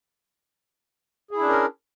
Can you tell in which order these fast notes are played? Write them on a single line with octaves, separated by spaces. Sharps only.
G#4 E4 D4 C#4 A#4